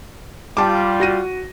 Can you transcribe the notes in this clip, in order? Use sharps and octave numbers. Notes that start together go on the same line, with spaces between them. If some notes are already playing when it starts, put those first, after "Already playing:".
G3 F4 G5 A5 D6
F#4 A#6 D#7